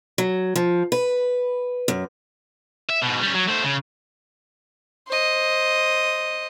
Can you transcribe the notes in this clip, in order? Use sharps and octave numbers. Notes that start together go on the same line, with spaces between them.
F#3
F3
B4
F#2
E5
G#2 B2
G3 C#4
F#3
A3 C5
C#3
C5 D#5